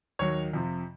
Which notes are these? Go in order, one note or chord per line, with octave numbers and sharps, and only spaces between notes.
D#2 D#3 F#3 C#5
F2 C3 F3